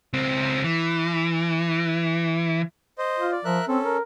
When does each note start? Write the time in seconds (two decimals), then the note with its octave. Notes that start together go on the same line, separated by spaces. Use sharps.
0.13 C#2 C4
0.64 E3
2.98 C5 D#5
3.19 F4
3.32 D5
3.45 F3 A#4 E5 F#6
3.68 C4 C#4 A4
3.84 A#4